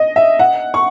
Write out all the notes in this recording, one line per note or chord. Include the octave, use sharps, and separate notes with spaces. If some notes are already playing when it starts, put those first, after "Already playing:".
Already playing: D#5
E5
F#5
C#6